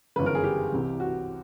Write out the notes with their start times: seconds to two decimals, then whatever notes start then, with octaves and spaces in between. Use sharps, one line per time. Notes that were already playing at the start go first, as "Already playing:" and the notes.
0.16 G1 F#2 C#3 E3 B4
0.26 A#4
0.35 G#4
0.44 G4
0.72 C2 C3 E3
1.00 F#4